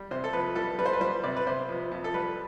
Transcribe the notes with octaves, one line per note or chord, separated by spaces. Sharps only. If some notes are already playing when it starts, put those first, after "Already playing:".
Already playing: G3
C3 C5
A4
F2 B4
G3 A4
G3 B4
C5
B4
G3 C5
C3 D5
B4
C3 C5
F2
F2
A4
G3 B4